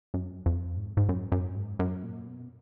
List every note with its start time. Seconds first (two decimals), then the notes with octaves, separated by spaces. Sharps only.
0.14 F#2
0.46 F2
0.77 G#2
0.97 G#2
1.09 F#2
1.32 F#2
1.56 G#2
1.79 F#2
2.03 A#2
2.27 B2